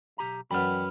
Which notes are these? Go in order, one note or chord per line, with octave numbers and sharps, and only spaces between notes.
B1 G4 A#5
F#2 E3 B3 D5 G5 B5 F6